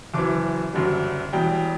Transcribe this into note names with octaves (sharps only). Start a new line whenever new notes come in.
F#1 F#2 E3 D6
F#1 F#2 D3 G3
E1 E2 B2 G3 G5